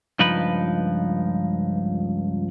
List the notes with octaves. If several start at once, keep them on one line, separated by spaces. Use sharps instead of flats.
C#2 G2 F3 D#4 B4 B5